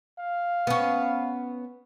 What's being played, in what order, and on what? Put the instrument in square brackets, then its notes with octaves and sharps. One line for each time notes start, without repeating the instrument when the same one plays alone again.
[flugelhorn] F5
[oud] B3 C#4